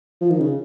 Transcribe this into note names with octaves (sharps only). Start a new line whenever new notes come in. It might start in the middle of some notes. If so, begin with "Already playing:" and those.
F3
D#3
C#3